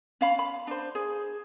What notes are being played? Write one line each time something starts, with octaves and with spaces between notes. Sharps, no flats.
C#4 F5 B5
B5
D4 C5
G#4